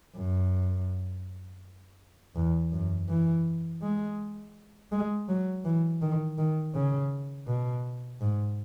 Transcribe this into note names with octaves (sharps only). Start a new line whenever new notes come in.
F#2
E2
F#2
E3
G#3
G#3
F#3
E3
D#3
D#3
C#3
B2
G#2